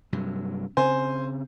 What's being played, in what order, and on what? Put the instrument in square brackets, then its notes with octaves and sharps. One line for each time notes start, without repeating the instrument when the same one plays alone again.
[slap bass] G2 C3 F#3
[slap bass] C#3 C4 [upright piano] C5 G#5